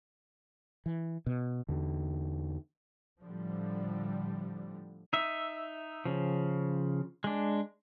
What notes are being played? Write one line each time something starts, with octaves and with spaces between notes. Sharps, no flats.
E3
B2
E2 D3
A2 D3 F3 G3
D#4 E5
C#3 F3
G#3 D4